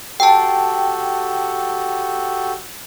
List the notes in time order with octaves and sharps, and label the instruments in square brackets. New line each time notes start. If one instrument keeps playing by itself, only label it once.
[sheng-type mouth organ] F#4 G4 A4 [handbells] G5 A5